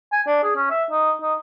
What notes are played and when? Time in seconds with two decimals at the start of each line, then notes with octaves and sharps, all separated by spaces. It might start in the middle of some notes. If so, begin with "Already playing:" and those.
0.12 G#5
0.27 D4
0.43 G#4
0.56 C#4
0.70 E5
0.91 D#4
1.21 D#4